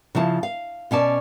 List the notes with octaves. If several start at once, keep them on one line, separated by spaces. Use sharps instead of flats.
C#3 F3 E4 A5
F5
B2 C#4 D5 A5